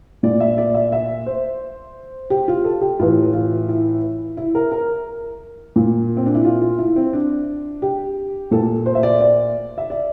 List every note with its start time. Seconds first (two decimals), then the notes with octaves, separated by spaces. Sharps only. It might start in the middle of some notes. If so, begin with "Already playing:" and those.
0.23 A#2 D5
0.40 E5
0.58 D5
0.74 E5
0.92 E5
1.26 C5
2.30 G4
2.48 F4
2.65 A4
2.81 G4
2.99 A2 E3 F4
3.34 F4
3.69 E4
4.37 E4
4.55 A#4
4.72 A#4
5.76 A#2
6.17 C4
6.26 D4
6.35 E4
6.45 F4
6.61 F4
6.79 E4
6.96 C4
7.13 D4
7.82 G4
8.51 A#2 A4
8.86 C5
8.95 E5
9.03 D5
9.21 D5
9.78 E5
9.90 D5